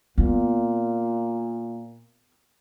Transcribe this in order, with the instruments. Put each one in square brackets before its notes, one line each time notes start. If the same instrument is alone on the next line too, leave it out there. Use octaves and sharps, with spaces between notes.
[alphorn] A#2 [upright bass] B3